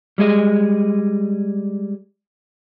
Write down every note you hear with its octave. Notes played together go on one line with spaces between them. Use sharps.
G3 G#3 G#4 D#5